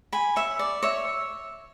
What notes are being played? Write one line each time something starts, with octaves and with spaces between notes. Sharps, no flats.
G#5 B5
C#5 E5
D5
C#5 E5